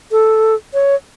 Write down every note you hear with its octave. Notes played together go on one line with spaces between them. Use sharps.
A4
C#5